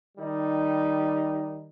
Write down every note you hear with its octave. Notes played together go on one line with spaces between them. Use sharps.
D#3 G3 D#4